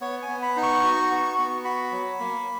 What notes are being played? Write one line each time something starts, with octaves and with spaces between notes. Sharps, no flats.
B3 C#5
G#5
B3
B5
D#4
C#6
F#4
B3
B3
F#4 B5
F#3
A#3